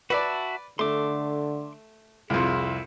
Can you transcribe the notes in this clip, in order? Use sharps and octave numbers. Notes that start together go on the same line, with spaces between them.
F#4 B4 D5 E5 A5
D3 A3 C6 D6
C2 F2 E4 G#4